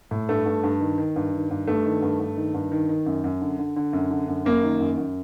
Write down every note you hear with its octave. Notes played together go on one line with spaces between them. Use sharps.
A2
G2 A3
G2
G2
D#3
D#3
G2
D#3
G2
G2 A3
D#3
G2
G2
D#3
G2
D#3
D#3
F#2
F#2
D3
D3
D3
F#2
D3
F#2
F#2 A#3
D#3
F#2
F#2